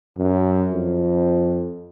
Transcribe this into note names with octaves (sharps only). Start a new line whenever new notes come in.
F#2
F2